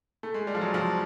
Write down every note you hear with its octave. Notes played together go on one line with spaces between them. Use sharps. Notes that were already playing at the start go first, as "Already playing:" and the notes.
A3
G#3
G3
F3
F#3
F3